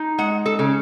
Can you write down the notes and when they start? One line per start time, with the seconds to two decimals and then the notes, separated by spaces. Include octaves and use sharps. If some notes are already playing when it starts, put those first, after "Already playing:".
Already playing: D#4
0.18 G#3 F#5
0.46 A4
0.59 C#3